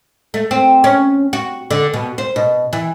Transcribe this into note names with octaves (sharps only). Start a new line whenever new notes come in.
A3
C4
C#4
F#4
D3
B2
C5
B2
E3